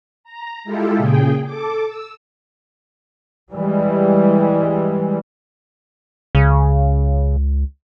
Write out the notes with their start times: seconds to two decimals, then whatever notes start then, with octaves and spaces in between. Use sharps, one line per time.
0.24 A#5
0.64 G#3 E4 F4 G4 A4
0.97 A#2 C#3 G#4 G5
1.45 A4 D6
1.86 E6
3.52 E3 G3 G#3
6.35 C#2 C#3